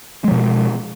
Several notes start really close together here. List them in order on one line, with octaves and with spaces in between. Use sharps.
G#3 F3 B2